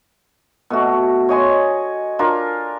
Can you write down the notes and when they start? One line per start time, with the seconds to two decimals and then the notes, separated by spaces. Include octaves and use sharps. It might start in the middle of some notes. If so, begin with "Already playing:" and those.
0.70 B2 A3 F#4
1.29 C#5 D#5 G#5 C6
2.19 D4 F4 A#4